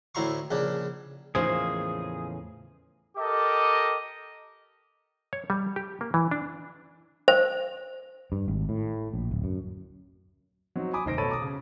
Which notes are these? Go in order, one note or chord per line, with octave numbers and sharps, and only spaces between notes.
D2 A2 E4 A#5 C6 C#6
A#1 C#3 D4
E2 A2 C#3 F3 A#3 D#4 G#4 C5
G4 A4 A#4 D#5 D6
C#5
G3
G4
A#3
E3
D4
C5
G2
G#1
A2
A#1
D1
F#2
F#3 C4 D#4
G#5 B5 D6 D#6
F1 D#3 C5 A#6 D7
B2 A4 C#5 B5 A6 D#7
A#5 D6 D#6
C#3